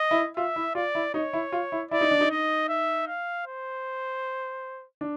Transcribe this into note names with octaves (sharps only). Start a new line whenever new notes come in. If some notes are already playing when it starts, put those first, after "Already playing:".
Already playing: D#5
E4
F4 E5
E4
F4 D5
E4
D#4 C#5
E4
F4
E4
E4 D5
D#4
D4
D#4
D#5
E5
F5
C5
D4